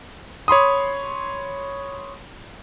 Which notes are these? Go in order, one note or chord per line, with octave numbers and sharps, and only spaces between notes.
C#5 B5 C6 D#6